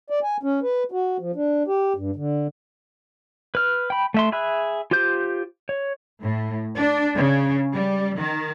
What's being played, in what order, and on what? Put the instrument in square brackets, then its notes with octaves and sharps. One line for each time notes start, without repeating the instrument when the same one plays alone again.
[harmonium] D5
G#5
C#4
B4
F#4
F3
D4
G4
G2
D3
[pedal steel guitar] B4 F6
G5 B5
A3 E5 C6
G#4 E5 B5 E6 F#6
F4 G4 C5 G6
C#5
[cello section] A2
D4
C#3
G3
D#3